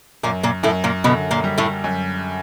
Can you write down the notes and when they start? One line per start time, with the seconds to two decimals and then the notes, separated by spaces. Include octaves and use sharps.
0.23 F#2 A#2 A#3
0.43 A#2 A#3
0.63 F#2 A2 A3
0.84 A#2 A#3
1.04 B2 D3 B3
1.31 A#2 A#3
1.44 G3
1.58 A2 A3
1.84 F#2